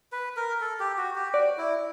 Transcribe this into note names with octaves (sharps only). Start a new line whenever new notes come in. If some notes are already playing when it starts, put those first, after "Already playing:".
B4
A#4
A4
G4
F#4
G4
F#4 D5
E4